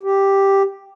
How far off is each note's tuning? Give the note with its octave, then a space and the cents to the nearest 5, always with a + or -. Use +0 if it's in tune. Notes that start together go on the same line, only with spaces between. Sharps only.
G4 +0